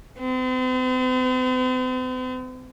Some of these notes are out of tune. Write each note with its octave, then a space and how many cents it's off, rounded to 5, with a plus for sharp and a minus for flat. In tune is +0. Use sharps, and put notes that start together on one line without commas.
C4 -45